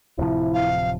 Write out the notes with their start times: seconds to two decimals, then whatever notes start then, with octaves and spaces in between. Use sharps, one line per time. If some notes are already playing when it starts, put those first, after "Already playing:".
0.19 D1 C3 F3 E4
0.54 F5